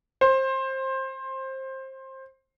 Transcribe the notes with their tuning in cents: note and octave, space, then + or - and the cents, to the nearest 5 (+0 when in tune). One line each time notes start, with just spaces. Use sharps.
C5 +20